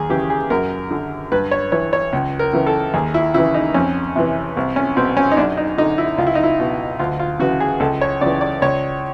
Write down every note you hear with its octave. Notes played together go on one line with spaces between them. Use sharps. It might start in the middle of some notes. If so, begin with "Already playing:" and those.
Already playing: D#2 G#4
C#3 E3 G4
G#4
F#2 A#4
D3
G2 B4
C#5
E3 C#5
C#5
C#2
A#4
C#3 E3
A4
D#2 G#4
E4
C#3 E3 E4
D#4
F2 C#4
C3 E3
C2
C#4
B2 C4
C#4
D#4
F#2 D4
D#4
D3 D#4
E4
C#2 F4
E4
D#4
E4
B2
D2 F4
F4
C#3 E3 F#4
G#4
C#2 A4
C#5
C#3 E3 D5
D5
C#2 C#5